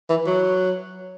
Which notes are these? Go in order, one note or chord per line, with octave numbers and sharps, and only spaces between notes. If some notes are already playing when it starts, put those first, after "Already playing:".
E3
F#3